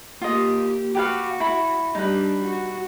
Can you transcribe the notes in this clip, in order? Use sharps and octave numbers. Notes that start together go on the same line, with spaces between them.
A#3 F4 G4 D#5
F#4 G4 B4 F5
E4 B5
G3 D4 D#4 B4
F#4